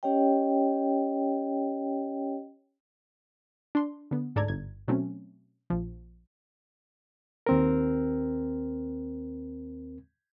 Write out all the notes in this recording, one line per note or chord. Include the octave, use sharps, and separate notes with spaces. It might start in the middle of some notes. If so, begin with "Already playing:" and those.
C#4 G4 C#5 D#5 G5
D4 C6
D3 B3
D2 G#2 A4 D5 A#5 G#6
G1 G#6
B2 F#3 A3 C4 C#4
A#1 F3
D#2 C4 A#4